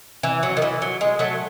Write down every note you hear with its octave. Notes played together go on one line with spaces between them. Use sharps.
E3
F#3
D#3
E3
F#3
G#3
F#3 A3